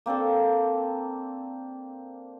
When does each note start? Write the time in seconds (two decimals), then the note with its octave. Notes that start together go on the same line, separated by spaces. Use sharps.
0.06 A#3 C4 D4 A4